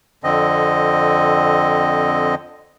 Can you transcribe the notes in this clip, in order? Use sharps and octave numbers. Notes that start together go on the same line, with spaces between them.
F2 D3 C4 D#5